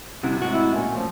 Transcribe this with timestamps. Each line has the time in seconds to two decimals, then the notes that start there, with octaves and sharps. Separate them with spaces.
0.23 C3 G3 E4 F#4
0.42 A2 G#3 F#4
0.53 E4
0.74 A#2 C#4
0.96 F3 A3